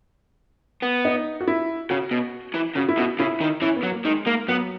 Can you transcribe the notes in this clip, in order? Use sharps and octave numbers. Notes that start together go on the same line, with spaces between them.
B3
D#4
F#4
E4
C#3 F#4
B2
E3
C#3 F#4
E4
B2 F#4
C#3 E4
D#3
E3 C#4
B3
F#3
A#3
D#3 G#3
A#3
F#3 B3